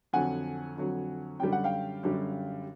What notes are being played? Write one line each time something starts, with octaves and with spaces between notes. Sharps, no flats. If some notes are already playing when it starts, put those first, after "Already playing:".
F2 D3 F#3 F#5 G#5
F2 D3 F#3
F#2 D3 G3 G5
F#5
F5 G5
F#2 D3 G3